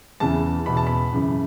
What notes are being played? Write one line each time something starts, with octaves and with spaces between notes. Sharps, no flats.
E2 C#3 E3 A5
E2 B2 B5
A5
B5
F#2 C#3 E3